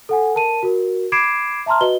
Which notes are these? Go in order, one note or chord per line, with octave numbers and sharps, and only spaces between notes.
A4 F#5 G#5
A#4 A5 D#7
F#4 A#4
B5 D6 G#6 C7 D7 E7
E5 A5 A#5 C6 F6
F#4 B4 D#5 G7